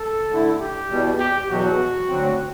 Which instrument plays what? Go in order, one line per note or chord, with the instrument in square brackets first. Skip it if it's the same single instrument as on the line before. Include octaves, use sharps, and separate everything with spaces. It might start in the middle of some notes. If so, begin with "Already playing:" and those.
Already playing: [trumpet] A4
[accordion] D3 A3 E4
[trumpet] G4
[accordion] E2 B2 G3
[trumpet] G4
[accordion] E2 B2 F#3 [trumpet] F#4
[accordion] D2 D3 F#3 C4